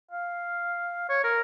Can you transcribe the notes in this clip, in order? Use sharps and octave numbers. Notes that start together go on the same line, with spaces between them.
F5
C#5
A#4